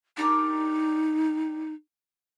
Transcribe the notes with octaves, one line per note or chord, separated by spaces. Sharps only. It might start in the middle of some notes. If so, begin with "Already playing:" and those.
D4 D#4 G4 A#4